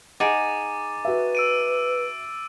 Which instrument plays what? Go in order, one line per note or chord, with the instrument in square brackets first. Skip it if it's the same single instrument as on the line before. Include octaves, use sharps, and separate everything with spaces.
[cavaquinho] D#4 G#4 [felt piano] F#5 D7 [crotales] D6 A6 D#7
[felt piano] F#4 E5 [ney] B4
[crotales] E6 D7 D#7